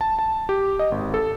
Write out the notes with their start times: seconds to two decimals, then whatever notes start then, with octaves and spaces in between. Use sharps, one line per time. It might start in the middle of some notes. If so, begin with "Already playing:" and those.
0.01 A5
0.19 A5
0.49 G4
0.79 D#5
0.92 G#1
1.14 A4